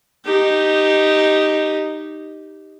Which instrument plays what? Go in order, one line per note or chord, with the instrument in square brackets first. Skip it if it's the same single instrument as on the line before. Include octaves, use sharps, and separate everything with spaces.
[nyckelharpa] D#4 G4